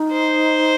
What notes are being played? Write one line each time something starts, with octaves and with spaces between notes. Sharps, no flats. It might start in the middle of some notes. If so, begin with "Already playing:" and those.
Already playing: D#4
C5